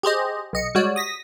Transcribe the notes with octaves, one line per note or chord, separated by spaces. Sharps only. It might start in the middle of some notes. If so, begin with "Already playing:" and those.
G4 G#4 C5 D#5
B1 D#5 C#7
G3 G#3 F#4 C#5 D5
D#6 A#6 B6